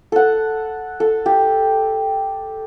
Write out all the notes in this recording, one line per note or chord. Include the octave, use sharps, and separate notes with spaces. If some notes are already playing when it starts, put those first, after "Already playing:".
A4 F#5
A4
G4